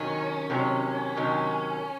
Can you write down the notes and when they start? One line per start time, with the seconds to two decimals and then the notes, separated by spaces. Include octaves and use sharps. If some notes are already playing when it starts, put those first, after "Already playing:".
Already playing: C3 D#3 F#3 C#4
0.50 C3 D#3 F#3
1.16 C3 D#3 F#3